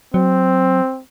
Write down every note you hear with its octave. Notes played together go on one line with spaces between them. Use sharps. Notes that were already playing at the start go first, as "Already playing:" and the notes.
F#3 C4